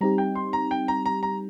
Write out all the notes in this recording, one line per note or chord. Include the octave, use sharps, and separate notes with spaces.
G3 C4 D#4 G4 A#5
G5
C6
A#5
G5
A#5
A#5
A#5